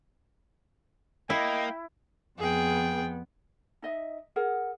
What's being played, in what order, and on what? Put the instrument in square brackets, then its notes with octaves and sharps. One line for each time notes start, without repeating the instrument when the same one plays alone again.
[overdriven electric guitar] A#3 [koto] E4 [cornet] D#5 [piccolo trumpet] G5
[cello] F2 B3 [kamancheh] G#4 G5
[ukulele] D#4 D#5 E5
G#4 A#4 F#5